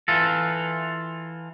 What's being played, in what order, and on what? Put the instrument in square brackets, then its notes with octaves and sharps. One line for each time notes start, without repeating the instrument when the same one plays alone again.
[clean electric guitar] E3 F4 A4